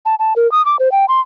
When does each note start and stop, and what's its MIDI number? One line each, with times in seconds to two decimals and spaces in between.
0.06 0.15 81
0.19 0.34 81
0.36 0.50 70
0.52 0.64 87
0.65 0.77 86
0.79 0.91 72
0.92 1.05 79
1.09 1.20 84